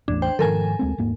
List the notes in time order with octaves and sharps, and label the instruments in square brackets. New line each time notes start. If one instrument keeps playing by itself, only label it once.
[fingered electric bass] A1 E2 A2 [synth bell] D4
[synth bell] C5 G5
[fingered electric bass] G#2 D#3 F3 [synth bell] A4 A#4 G#5
[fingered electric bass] D2 G#3 C4
D#1 G#2 A#3